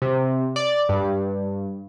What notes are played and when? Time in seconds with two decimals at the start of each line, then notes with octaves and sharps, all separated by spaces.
0.02 C3
0.56 D5
0.89 G2